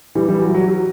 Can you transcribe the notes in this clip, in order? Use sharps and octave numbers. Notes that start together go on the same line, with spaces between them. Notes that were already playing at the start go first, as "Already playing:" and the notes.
E3 G3
E3 G3
F#3
F#3
F#3